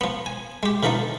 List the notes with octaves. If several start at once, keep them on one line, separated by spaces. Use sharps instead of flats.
F3 B3
G#5
G#3 G4
B2 D3 E3 F3 D#4 A4